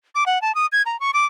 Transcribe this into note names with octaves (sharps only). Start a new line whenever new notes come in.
D6
F#5
A5
D#6
G#6
A#5
C#6
D6